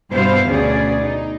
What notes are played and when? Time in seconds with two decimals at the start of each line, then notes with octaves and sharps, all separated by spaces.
0.12 G2 B2 E4 C5 F5
0.50 D2 B2 C#4 G#4 D5
1.02 D#4